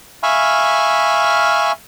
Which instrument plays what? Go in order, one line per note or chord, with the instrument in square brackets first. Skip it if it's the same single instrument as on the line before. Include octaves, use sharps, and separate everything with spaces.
[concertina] E5 F5 G#5 B5 C#6 F6